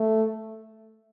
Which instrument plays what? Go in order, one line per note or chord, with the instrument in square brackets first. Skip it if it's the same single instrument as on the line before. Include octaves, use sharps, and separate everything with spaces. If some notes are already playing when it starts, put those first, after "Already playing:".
Already playing: [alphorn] A3